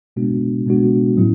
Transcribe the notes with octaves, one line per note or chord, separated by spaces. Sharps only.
B2 G#3 B3 D4 F#4
B2 G#3 B3 D4 F#4
A2 F#3 C#4 E4